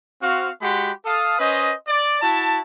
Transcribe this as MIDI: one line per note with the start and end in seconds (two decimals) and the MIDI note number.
0.22 0.50 60
0.22 0.50 66
0.22 0.50 77
0.62 0.91 56
0.62 0.91 66
0.62 0.91 67
0.62 0.91 78
0.62 0.91 83
0.62 0.91 84
1.05 1.38 69
1.05 1.38 77
1.05 1.38 87
1.39 1.74 61
1.39 1.74 71
1.39 1.74 72
1.39 1.74 75
1.88 2.18 74
2.22 2.60 64
2.22 2.60 66
2.22 2.60 81